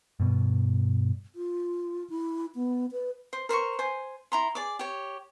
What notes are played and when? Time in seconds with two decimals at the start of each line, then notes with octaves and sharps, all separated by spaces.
0.20 G2 B2
1.35 F4
2.10 E4
2.55 B3
2.92 B4
3.33 C5
3.49 A#4 C5 C6 C#6
3.79 C5 G#5
4.32 E4 A#5 C6
4.55 G#4 D5 D6
4.79 G4 C#5